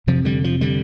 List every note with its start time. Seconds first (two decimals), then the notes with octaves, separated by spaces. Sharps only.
0.07 F2 C3 F3
0.25 D3 G3
0.44 F3
0.61 D3 G3